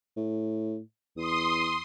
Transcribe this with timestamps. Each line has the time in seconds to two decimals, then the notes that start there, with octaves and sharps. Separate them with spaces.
0.16 A2
1.16 E2 C6 D#6